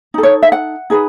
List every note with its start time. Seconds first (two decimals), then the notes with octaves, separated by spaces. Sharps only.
0.14 D#4 A4
0.23 C#5
0.42 E5
0.52 F#5
0.90 D#4 G#4 B4